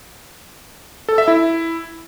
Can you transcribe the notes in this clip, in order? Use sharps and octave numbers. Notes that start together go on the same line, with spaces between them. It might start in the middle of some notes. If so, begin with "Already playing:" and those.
A4
E5
E4